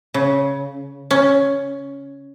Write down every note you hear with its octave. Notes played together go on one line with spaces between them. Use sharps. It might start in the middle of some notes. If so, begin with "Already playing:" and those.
C#3
C#4